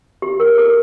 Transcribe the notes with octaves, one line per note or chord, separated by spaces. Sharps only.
G4
A#4
A4